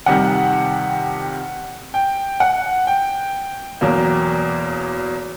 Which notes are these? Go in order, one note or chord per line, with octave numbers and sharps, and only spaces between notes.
F2 C3 D#3 G3 F#5
G5
F#5
G5
E2 B2 F#3 A#3